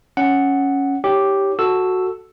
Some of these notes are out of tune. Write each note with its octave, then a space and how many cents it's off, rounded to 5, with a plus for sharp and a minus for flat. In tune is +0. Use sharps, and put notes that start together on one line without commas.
C#4 +0 F#5 +0
D#4 +25 G4 +0 C#5 +0
F#4 +0 A4 +0 E6 +0